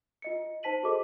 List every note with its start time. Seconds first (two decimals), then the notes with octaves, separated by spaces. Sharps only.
0.22 F4 D#5 C#7
0.63 D#4 C5 A5 B6 D#7 F#7
0.83 F#4 G#4 A4 C5 D#5 D6